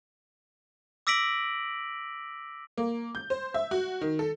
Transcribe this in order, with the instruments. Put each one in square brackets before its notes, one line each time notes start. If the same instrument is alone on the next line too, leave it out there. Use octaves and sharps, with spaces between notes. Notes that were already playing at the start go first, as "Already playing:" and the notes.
[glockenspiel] D6 E6 A#6 B6 D7 F#7
[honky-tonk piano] A#3
G6
C5
E5
F#4
D#3
A4